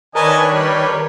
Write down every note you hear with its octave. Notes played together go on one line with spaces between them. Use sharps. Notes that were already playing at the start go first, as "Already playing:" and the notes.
D#3 D4 A#4 B4 C#5 D#5 G#5 A5
G3